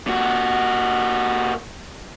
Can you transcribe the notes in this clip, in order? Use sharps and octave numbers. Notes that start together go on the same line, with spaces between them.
A#2 F#4